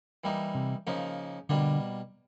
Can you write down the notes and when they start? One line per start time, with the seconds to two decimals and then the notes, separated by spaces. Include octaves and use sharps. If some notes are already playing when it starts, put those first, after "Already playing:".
0.24 E3 G3 A#3 D#4
0.55 C3
0.87 C#3 F3 A#3 D#4
1.49 B2 D3 G3 A#3 D4